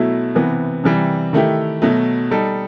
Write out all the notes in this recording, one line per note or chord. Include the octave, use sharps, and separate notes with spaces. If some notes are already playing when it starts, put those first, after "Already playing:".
Already playing: B2 F#3 A3 E4
C3 E3 B3
C3 E3 G3
D#3 A3 E4 G4
B2 F#3 A3
G3 D#4 A4